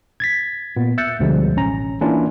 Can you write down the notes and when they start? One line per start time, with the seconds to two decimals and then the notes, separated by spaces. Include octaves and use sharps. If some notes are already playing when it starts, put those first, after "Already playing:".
0.20 G#6 A6 B6
0.77 A#2 B3
0.98 E5 E6 F#6 G6 A6 C#7
1.20 D2 B2 D3 F3 G3 G#3
1.56 A1 C#4 A#5
2.01 E3 A#3 C#4 D4 E4 F4